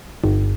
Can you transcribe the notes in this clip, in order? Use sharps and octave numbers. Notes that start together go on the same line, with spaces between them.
G1